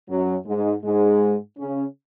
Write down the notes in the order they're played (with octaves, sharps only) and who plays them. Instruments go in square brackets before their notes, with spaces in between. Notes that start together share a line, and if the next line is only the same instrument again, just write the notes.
[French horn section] F#2 F#3
G#2 G#3
G#2 G#3
C#3 C#4